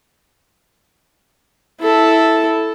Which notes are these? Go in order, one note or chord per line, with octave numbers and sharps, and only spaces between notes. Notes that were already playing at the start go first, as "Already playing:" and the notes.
E4 A4